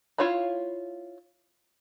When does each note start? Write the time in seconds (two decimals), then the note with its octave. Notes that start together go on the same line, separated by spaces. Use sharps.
0.18 E4 F4 C#5 F5 B5